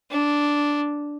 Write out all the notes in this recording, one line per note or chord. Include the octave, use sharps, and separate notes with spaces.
D4